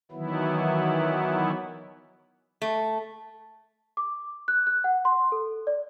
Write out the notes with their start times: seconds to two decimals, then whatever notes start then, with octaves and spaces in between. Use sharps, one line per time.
0.12 D#3 E3 F#3 B3 E4
2.62 A3
3.97 D6
4.48 F#6
4.67 F#6
4.84 F#5
5.05 C6
5.32 A4
5.67 D5